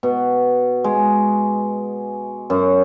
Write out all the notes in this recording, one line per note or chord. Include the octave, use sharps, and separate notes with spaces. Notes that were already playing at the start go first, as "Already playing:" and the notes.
B2
G#3
F#2